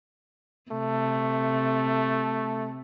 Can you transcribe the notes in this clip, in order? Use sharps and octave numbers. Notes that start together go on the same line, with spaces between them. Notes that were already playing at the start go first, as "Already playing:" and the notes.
C3 A3